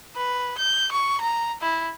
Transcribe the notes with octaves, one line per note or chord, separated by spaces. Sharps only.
B4
G6
C#6
A#5
E4